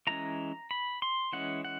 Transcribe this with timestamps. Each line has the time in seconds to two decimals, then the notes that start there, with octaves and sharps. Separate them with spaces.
0.07 E3 G#3 C#4 A#5
0.71 B5
1.02 C6
1.33 E3 G#3 C#4 F#5
1.65 F#5